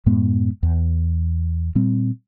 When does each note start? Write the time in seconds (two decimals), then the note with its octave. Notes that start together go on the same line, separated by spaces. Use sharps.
0.06 F#2 A2 G#3 B3
0.63 E2
1.75 A#2 G3 C4